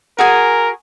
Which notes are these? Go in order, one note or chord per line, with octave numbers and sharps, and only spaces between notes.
F#4 G#4 A#4 G#5